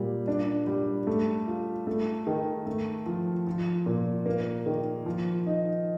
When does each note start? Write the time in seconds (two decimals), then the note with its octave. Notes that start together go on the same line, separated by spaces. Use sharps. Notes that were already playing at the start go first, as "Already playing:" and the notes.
Already playing: A#2 G3
0.28 D4
0.67 G3
1.07 A3
1.47 F4
1.87 A3
2.27 D#3
2.66 A3
3.06 F3
3.47 F3
3.86 A#2
4.26 A#3
4.66 D#3
5.06 F3
5.46 D#4